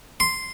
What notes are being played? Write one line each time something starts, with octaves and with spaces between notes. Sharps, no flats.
C6